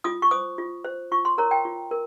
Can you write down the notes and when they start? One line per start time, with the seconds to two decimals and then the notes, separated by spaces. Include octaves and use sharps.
0.04 F4 D#6
0.22 C#6
0.31 C5 D#6
0.58 F4
0.84 C5
1.12 F4 C#6
1.25 C6
1.38 A#4 C#5 A#5
1.51 G5
1.65 F4
1.91 A#4